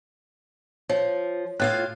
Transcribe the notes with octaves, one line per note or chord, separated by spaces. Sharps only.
F3 C#5
A2 F4 F5 F#6